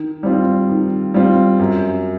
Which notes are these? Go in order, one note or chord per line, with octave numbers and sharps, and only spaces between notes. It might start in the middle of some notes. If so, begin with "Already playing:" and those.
Already playing: D#3
G3 C4 F4
D#3
G3 C4 F4
F#2